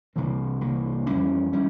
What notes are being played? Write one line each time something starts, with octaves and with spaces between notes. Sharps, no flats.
C2 C3 E3 A#3
C2 C3 E3 A#3
F2 E3 G3 C#4
E3 G3 C#4